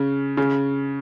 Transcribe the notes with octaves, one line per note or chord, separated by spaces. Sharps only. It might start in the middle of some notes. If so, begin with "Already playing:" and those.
Already playing: C#3
C#3